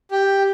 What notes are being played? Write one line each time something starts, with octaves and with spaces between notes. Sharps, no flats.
G4